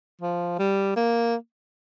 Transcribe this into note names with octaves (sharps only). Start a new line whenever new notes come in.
F3
G3
A#3